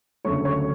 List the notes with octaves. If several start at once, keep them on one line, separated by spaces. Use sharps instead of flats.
D2 C#3 F#3 A3 C#5 C#6
C#5 C#6